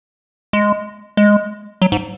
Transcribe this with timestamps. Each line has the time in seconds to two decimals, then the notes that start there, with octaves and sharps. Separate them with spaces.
0.53 G#3
1.17 G#3
1.82 F#3
1.92 G#2